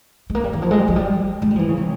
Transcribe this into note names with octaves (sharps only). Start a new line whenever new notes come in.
G#3
A#3
G3
E3
F3
G#3
G3
F3
G3
G#3
G3
F3
E3
C#3
C3